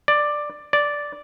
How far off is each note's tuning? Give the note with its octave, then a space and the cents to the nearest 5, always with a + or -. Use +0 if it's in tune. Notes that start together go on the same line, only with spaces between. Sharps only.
D5 +10
D5 -5